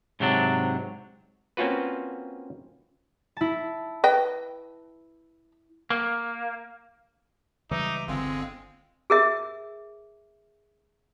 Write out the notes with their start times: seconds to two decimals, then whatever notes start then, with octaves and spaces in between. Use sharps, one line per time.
0.20 G#2 C3 F#3 D4
1.57 A#3 C4 C#4 F4 F#4 B4
3.37 E4 A5
4.04 B4 D#5 G5
5.90 A#3
7.71 C#2 E3 G3 D#4 E5 D6
8.08 G1 D3 G#3 C4 F4
9.10 G#4 A#4 E5